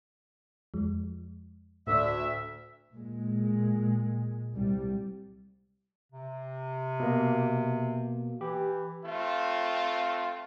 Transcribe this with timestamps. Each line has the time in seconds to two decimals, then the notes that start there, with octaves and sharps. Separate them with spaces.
0.74 F2 F3 G#3
1.87 D2 A2 D5 E5
2.93 A#2 G#3
4.54 C2 G3
6.12 C3
7.00 B2 A#3
8.41 E3 G4
9.04 A3 C4 F4